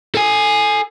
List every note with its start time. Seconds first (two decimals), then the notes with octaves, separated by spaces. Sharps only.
0.15 A4 G#5